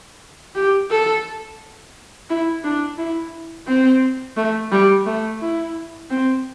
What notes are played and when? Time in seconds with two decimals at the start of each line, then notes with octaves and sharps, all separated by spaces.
0.55 G4
0.90 A4
2.29 E4
2.64 D4
2.98 E4
3.67 C4
4.37 A3
4.72 G3
5.06 A3
5.41 E4
6.10 C4